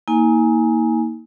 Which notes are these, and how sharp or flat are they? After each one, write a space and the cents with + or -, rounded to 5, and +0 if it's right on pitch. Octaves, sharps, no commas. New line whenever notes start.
A#3 +0 D#4 +40 G#5 +0